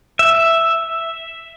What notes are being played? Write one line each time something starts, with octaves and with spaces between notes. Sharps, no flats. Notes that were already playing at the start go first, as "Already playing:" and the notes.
E5